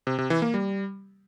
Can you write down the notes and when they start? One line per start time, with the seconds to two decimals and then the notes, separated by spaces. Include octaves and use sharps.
0.07 C3
0.18 C3
0.30 E3
0.42 A#3
0.54 G3